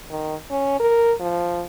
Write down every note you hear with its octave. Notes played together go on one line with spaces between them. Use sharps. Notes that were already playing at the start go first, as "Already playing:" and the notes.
D#3
C#4
A#4
F3